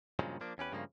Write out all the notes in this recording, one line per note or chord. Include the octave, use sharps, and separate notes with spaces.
G2 A#2 C#3 F3 F#3 G#3
F3 A#3 D4
E2 C#4 G4 B4
G2 C#3 F3 A3 A#3